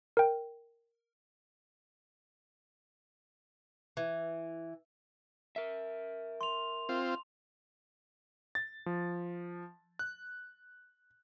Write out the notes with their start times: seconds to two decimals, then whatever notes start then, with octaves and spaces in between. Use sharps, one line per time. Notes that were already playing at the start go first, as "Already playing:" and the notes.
0.17 A#4 G5
3.97 E3
5.56 A#4 E5
6.41 C6 F7
6.89 C4 F4
8.55 A6
8.86 F3
9.99 F#6